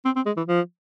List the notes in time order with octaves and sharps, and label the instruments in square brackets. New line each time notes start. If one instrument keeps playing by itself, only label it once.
[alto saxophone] C4
C4
G#3
E3
F3